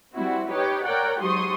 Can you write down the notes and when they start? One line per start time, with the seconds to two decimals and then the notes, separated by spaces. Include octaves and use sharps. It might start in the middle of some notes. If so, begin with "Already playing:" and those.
0.14 G3 C4 E4 F#4
0.51 D#4 G4 B4 C#5
0.84 A#4 C#5 D5 F#5 G5
1.20 G#2 F#3 G4 C6 C#6 D#6